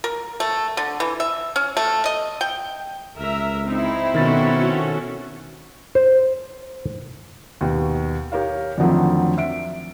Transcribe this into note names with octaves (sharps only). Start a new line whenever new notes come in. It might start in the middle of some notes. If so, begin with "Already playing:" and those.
A#4
A3
D3
E3
E5
C#4
A3
D#5
G5
C#2 A#4 E5
C4 D#4 E4
B2 D#3 C#4 F#4 A4 A6
C5
D#2 B2
G4 A#4 C#5 F5
F2 D3 D#3 F3 F#3 A3
E5 D7